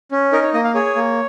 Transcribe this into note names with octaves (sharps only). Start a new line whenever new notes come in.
C#4
D#4 A#4
C#5
A#3 D#5
F5
G#4 C#5
A#3